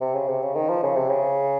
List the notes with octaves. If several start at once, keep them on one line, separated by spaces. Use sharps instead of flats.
C3
C#3
C3
C#3
D#3
F3
C#3
C3
C#3